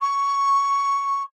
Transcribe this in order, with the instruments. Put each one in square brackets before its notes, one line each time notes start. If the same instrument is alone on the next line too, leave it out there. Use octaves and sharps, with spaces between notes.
[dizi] C#6